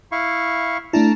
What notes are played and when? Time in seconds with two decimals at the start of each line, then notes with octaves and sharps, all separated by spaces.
0.12 E4 F5 C#6
0.93 A3 D4 E4 A5 A#5